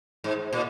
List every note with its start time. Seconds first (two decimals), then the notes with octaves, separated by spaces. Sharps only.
0.24 G#2
0.53 A#2